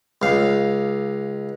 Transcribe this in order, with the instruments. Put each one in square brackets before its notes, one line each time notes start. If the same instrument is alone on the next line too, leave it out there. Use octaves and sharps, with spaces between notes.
[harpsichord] C#2 F5